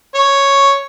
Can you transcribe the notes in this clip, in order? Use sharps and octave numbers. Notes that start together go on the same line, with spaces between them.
C#5